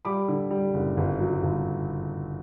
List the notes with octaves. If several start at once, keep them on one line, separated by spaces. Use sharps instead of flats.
G3 B5 D6
D3
G3
F#1
G1
F#3
G1